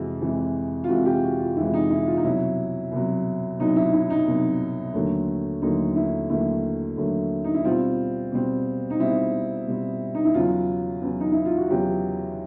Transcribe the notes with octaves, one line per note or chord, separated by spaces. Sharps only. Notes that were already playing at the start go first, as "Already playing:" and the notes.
Already playing: F2 C3 E3 G#3 F#4
F2 C3 E3 G#3
F4
F2 C3 E3 G#3 F#4
G4
F#4
F4
F2 C3 E3 G#3 E4
D#4
E4
F4
D#4
C2 B2 F#3 E4
C2 B2 F#3
C2 B2 F#3 D#4
E4
E4
D#4
C2 B2 F#3
D#2 D3 F#3 A3
D#2 D3 F#3 A3 D#4
E4
D#2 D3 F#3 A3 E4
D#2 D3 F#3 A3
D#4
E4
B2 G3 C4 F4
B2 G3 C4
D#4
B2 G3 C4 E4
B2 G3 C4
D#4
E4
E2 C#3 F#3 F4
E2 C#3 F#3
D#4
E4
F4
F#4
E2 C#3 F#3 G4